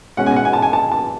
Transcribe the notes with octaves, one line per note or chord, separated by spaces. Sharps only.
B2 G#3 C#4 F#5
G#5
F#5
G#5
A5
G#5
A5
A5